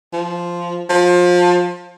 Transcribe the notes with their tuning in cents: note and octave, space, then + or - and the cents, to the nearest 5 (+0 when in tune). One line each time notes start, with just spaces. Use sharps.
F3 -5
F3 +25